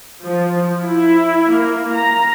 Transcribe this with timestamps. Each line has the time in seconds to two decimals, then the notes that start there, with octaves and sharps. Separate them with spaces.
0.22 F3
0.82 E4
1.52 A#3
1.94 A#5